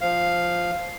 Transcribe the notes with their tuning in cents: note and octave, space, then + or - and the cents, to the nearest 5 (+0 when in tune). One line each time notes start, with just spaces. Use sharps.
F3 +0 F5 +0